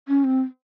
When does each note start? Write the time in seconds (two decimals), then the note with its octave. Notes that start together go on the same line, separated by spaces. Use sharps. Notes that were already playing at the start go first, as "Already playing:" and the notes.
0.08 C#4
0.24 C4